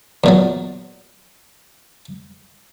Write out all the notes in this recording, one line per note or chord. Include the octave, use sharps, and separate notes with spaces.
E2 A#2 F#3